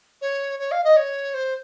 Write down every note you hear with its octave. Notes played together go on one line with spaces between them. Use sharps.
C#5
C#5
F5
D#5
C#5
C5